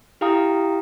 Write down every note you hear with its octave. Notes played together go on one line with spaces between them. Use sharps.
E4 G4 F5 G5 A#5 D#6